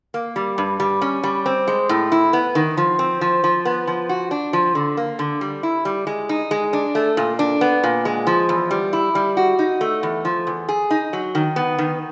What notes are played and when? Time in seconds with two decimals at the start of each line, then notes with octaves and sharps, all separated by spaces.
0.14 A#3
0.36 G3
0.58 G2
0.80 G3
1.01 C#4
1.23 G3
1.46 C4
1.67 G#3
1.89 A2
2.12 E4
2.33 B3
2.55 D#3
2.77 F3
2.99 C4
3.21 F3
3.44 F3
3.65 B3
3.87 F3
4.09 F#4
4.31 D4
4.53 F3
4.75 D3
4.97 A#3
5.19 D3
5.41 G3
5.63 E4
5.85 G3
6.07 G#3
6.29 D#4
6.51 G#3
6.73 D4
6.95 A3
7.17 A#2
7.39 D4
7.61 B3
7.83 A#2
8.05 G#3
8.27 F3
8.49 E2
8.71 G3
8.93 E4
9.15 G3
9.37 F#4
9.59 D#4
9.81 A3
10.03 E2
10.25 F3
10.47 E2
10.69 G#4
10.91 D#4
11.13 F#3
11.35 D#3
11.56 B3
11.78 D#3